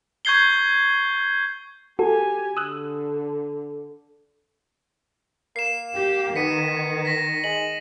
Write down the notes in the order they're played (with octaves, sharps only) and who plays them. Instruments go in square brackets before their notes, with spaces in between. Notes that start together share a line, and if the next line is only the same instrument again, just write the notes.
[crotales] C#6 G6 G#6 C7 G7
[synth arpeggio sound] F#4 A4 [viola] G4 G#5
[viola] D3 [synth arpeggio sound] D#6 E6 F#6
[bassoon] A#3 [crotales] C7 E7
[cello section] G4
[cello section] D#3 [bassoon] B3 [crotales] B6 C#7 D#7
[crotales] A#6 B6
[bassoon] G#3 [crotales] F#7